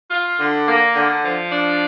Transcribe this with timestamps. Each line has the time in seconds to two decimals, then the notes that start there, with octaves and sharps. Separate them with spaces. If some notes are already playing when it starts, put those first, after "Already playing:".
0.09 F4
0.38 D3
0.67 A#3
0.95 D3
1.23 F3
1.52 D4